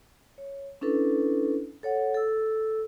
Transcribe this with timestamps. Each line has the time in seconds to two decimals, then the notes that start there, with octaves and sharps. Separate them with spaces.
0.38 C#5
0.81 C#4 D4 E4 A4 B4
1.83 A4 C#5 F#5
2.14 A4 E6